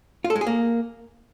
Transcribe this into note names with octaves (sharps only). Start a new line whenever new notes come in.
F4
A4
G#3
G#4
A#3